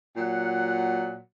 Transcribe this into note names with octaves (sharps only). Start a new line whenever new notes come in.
A#2 F#3 F#5